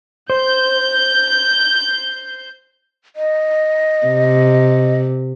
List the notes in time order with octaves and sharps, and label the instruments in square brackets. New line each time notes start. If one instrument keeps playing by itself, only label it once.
[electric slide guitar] C5 [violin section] G6
[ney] D#5
[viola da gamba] C3